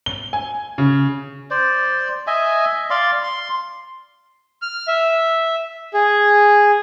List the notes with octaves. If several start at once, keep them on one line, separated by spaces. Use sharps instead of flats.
G7
G#5
C#3
C5 D5
D#5 E5 G#5
D5 F5 C6
C6
F6
E5
G#4